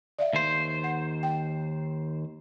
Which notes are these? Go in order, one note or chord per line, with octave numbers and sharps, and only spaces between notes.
D5 E5 F5
D#2 C5
F#5
G5